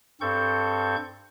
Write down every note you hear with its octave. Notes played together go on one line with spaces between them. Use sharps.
G2 C4 A4 C#6 G6